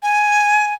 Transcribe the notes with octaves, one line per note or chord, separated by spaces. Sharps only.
G#5